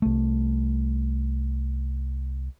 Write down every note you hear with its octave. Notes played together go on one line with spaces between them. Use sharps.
C2 A3